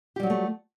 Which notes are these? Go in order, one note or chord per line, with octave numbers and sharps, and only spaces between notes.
F#3 G3 A3 F4 G4